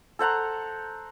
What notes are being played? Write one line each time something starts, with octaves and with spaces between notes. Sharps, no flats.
A4 C5 F#5 A#5